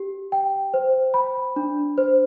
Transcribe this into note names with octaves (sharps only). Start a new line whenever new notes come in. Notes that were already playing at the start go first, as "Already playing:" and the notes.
Already playing: G4
G5
C5
B5
D4
C5